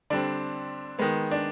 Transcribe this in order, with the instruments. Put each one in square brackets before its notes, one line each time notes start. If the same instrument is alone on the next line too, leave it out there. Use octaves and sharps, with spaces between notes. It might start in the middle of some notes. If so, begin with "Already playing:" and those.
[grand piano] D3 G3 C4 D4
D#3 G#3 B3
D4